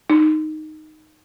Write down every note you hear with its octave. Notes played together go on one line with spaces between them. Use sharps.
D#4